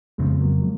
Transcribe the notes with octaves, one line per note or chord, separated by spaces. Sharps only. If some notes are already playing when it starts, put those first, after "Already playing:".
F2 C#3 F3 G#3 B3
F#3 A#3
F3 G#3